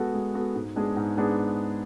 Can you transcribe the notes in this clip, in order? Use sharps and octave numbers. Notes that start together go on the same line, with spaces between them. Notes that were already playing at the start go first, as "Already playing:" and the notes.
Already playing: G#3 B3 F#4 A4
G#3
B3 F#4 A4
G#2
G#3 B3 D4 G#4
G#2
G#3 B3 D4 G#4